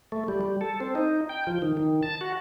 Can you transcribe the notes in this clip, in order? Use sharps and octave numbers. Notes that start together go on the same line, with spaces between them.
A3
G3
G3
A4
C4
D#4
G5
F3
D#3
D#3
A5
F#4